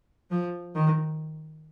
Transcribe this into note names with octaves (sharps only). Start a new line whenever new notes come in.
F3
D#3